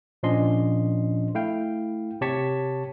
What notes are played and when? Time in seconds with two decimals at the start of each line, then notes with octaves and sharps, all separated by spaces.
0.23 A#2 F3 C#4 D4 D#5 C6
1.35 A3 E4 F5 G5
2.21 C3 G4 C#5 A5 C#6 B6